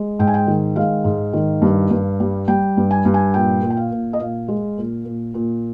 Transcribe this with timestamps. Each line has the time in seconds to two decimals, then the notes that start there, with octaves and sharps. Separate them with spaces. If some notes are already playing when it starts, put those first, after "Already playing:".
Already playing: G#3
0.19 G#2 G5
0.27 G#5
0.34 G5
0.47 D#3
0.76 G#3 F5
1.04 G#2
1.33 D#3
1.62 G2
1.90 G2
2.20 G3
2.48 G3 G5
2.77 G2
2.91 G#5
3.05 G2
3.14 G#5
3.34 A#2 G5
3.62 A#2
3.70 G5
3.77 F5
3.92 A#2
4.13 D#5
4.20 A#2 F5
4.48 G#3
4.78 A#2
5.05 A#2
5.34 A#2